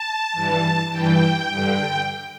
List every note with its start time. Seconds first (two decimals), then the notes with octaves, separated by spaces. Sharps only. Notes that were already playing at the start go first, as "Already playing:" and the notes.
Already playing: A5
0.33 G2 E3
0.92 G2 E3 G5
1.50 G2 D3